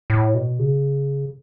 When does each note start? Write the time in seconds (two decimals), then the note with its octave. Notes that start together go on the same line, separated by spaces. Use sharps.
0.10 A2
0.35 B2
0.59 C#3